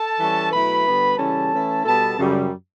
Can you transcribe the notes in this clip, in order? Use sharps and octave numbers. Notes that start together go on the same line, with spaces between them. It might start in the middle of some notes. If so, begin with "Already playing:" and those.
Already playing: A4 A5
E3 G3 C#4
B2 F#3 A3 E4 B4 B5
D3 G3 B3
C#3 E3 G3 C#4 A4 A5
E3 A3 C#4 E4
B2 G3 B3 A4 A5
F#2 C#3 G3